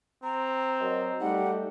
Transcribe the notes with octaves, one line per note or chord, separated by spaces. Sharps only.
C4 A#5
F#3 A#4 D#5
G3 A3 D#4 F#5